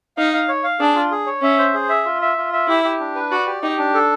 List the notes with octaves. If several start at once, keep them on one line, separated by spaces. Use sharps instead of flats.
D#4 F5
F5
C#5
F5
D4 G#4
F4
G#4
C#5
C#4 E5
C5
G#4
E5
F4
E5
F4
E5
E4 G4
G4
D4
B4
F#4 D5
G4
D#4 G4
D4
A4